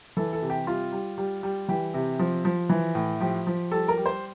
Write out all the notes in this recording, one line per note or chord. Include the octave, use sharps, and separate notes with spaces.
E3 A4
A4
C3
G4
G3 F4
G3
G3
G3
E3 G4
C3
F3
F3
E3
A2
F3 G4
F3
G3 A4
A#4
G3
C5